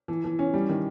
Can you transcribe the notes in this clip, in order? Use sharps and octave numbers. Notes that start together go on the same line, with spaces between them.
E3
E3
C#4
G3
D#3